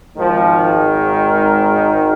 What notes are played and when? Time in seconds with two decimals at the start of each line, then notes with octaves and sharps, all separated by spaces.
0.16 G#1 G#2 D#3 F3